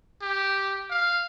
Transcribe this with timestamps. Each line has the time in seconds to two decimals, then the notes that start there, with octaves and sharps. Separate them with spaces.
0.22 G4
0.90 F5